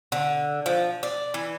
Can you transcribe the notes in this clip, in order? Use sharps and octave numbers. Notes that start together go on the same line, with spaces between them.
D3
F3
D5
E3